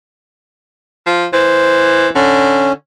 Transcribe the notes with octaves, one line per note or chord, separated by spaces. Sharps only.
F3
E3 C5
D3 C#4